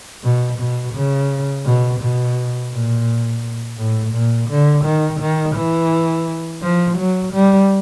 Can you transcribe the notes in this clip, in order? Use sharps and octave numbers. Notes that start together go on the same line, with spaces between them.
B2
B2
C#3
B2
B2
A#2
A2
A#2
D3
D#3
D#3
E3
F3
F#3
G3